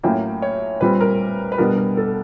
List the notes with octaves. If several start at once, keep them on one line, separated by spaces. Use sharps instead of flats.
A2 F#3 A#3 C#4 G5
C#5
A#2 G3 C4 B4
A#4
B4
B2 G3 B3 D4 A#4
A#4
A4